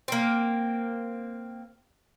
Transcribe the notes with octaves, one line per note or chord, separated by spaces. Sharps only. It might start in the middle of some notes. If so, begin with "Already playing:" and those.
A#3 C4